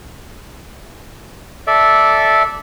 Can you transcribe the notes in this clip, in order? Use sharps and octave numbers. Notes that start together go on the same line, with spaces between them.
A4 D5 E5